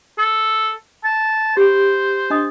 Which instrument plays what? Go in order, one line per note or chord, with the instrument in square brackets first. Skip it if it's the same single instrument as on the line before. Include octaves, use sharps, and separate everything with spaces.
[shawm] A4
A5
[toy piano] G4 B5 [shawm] C5
[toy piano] D4 D#5 D#6